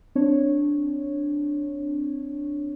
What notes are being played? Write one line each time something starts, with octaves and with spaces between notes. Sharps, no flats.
C4 D4 C#5